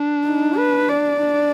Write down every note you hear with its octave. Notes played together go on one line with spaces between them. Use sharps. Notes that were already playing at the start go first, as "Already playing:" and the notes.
Already playing: D4
D#4
B4
D5
D4